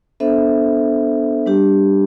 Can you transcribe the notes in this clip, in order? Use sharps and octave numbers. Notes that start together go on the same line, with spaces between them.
B3 D4 A4 C5 E5
G3 D4 G4